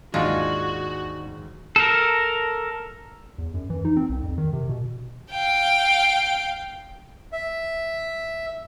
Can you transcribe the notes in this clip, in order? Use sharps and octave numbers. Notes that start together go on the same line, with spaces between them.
D#2 G#2 G#3 D4 D#4 F4 F#4 G#5
A4 A#4
E2
F#2
E3
D#4
C4
C2
F2
D#3
C3
B2
F5 G5
E5